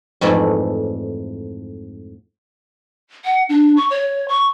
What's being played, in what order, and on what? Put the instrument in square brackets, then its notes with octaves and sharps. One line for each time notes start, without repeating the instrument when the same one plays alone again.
[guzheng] F2 G#2 E3 A3 D5
[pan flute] F#5
D4
C#6
C#5
C#6